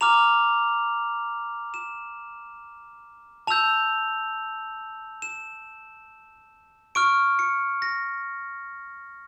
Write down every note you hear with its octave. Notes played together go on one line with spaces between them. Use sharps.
A#5 D6 F6 F7
E7
A5 E6 G6 F7
E7
C#6 F6 D7
C#7
A#6